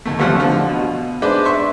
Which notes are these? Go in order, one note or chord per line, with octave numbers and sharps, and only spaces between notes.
D#2 A3
G#1 F3 G3 A3 F#5 F6
D3 F3
B2
G#3 D4 B4 C5 D5
E5 C6 C#6